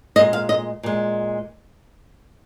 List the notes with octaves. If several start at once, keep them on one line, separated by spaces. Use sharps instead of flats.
A#2 G#3 D#5
F5
D#5
A#2 G#3